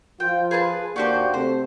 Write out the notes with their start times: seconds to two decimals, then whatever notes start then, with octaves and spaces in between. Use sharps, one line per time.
0.20 F3 F4 G5
0.51 G#4 B4 A5
0.96 D#2 A#3 D4 F#4 G4 C5
1.34 C3 A3 C5